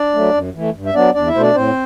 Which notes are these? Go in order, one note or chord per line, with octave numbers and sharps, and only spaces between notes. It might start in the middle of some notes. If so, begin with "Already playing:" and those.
Already playing: D4 D5
F#3 A3
F#2
E3 A3
G2
E5
F#3 B3 D4 D5
E2 D4 D5
E4 E5
B2 A3 C5
D4 D5
A2 C4 C5